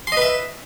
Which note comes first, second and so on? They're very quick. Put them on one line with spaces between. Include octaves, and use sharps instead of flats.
C6 D#5 B4 E5